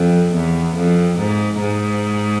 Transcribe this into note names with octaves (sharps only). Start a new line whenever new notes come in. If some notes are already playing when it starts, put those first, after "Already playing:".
Already playing: F2
E2
F2
G#2
G#2